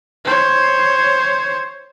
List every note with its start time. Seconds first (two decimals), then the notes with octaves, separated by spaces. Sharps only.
0.24 C5 C#5